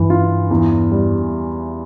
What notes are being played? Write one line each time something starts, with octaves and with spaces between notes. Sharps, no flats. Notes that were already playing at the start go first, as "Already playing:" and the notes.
Already playing: G2 E3
F4
E2
G3